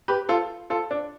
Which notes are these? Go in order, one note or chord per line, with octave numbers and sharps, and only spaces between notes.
G4 B4
F4 A4
F4 A4
D4